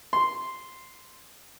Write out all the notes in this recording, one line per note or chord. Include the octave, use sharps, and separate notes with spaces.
C6